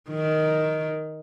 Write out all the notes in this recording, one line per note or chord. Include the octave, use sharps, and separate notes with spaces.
D#3